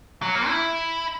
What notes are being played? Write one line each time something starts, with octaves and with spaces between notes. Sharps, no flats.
F#3
A#3
E4